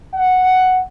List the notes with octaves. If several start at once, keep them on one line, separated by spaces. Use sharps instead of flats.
F#5